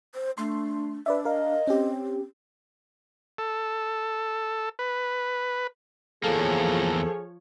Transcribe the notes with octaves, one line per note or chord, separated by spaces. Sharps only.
C5
A3 D4 C6
D4 B4 D5 E5
A#4 D#5 F5
C4 C#4 G4
A4
B4
E2 F3 A#3 G#4 A4 C#5